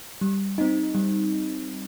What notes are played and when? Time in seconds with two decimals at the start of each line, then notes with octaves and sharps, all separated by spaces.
0.21 G3
0.58 C4 D#4
0.95 G3